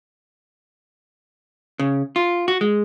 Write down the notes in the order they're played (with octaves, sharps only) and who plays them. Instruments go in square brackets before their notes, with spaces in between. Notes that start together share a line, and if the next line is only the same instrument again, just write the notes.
[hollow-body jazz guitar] C#3
F4
F#4
G#3